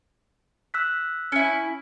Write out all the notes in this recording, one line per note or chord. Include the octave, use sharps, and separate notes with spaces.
E6 F#6 B6
C#4 E4